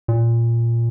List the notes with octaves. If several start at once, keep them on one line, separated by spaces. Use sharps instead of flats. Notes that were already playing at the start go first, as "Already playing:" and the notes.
A#2